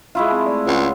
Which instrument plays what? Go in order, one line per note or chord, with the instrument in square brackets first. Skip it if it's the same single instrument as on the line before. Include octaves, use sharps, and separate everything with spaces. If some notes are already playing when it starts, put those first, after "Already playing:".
[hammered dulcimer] G#3 E4 F4 [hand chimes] E5 B5 C#6
[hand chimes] C4 A5
A3 D5
[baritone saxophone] C#2 [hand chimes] C#5 F#5 C6